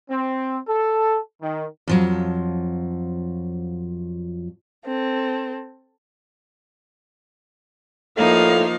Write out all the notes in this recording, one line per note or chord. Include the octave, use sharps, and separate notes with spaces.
C4
A4
D#3
F2 F3 F#3
C4 A4
A2 F3 A#3 D#4 F5